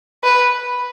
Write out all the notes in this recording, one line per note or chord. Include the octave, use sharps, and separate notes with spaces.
B4